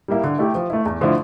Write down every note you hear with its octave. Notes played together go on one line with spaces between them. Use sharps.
G3 A#3 E4
D3
A3 E4 G4
F3
A3 E4
E2
D3 F3 A3 E4